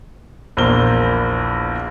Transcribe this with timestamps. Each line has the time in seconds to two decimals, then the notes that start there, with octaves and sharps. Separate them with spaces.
0.57 A#1 E2 A#4 C5 G7